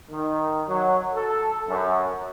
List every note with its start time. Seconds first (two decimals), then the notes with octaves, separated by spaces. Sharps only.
0.11 D#3
0.68 F#3
1.15 A4
1.69 F#2